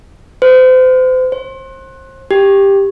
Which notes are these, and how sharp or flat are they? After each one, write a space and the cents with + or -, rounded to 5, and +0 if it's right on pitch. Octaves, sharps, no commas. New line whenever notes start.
C5 -35
C5 +30
G4 +10